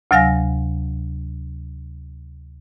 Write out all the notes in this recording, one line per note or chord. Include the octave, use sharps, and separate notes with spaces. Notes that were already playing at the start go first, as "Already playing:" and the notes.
D2 C3 F#3 F5 G#5 A#6